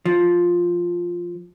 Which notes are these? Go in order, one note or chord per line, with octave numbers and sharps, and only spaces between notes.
F3